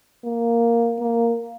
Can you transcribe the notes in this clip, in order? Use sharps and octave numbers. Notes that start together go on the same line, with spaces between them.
A#3
A#3